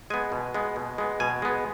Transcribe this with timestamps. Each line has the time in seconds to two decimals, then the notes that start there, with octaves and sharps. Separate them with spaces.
0.10 G#3 B3 G#5
0.32 B2
0.54 G#3 B3
0.76 B2
0.98 G#3 B3
1.20 B2 G#5
1.42 G#3 B3